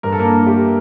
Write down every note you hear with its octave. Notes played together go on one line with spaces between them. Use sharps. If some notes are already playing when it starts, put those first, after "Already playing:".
G2 A#4
A4
A#3 A#4
D4
A3 G4